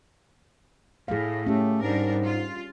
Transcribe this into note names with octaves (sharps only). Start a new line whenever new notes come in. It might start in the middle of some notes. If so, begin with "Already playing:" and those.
A2 G#4 F5
A3 C#4 G4
G#2 G3 D4 A#4
F4